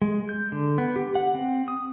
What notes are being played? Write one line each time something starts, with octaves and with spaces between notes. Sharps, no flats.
G#3
G6
D3
B3
G4
F#5
C4
D#6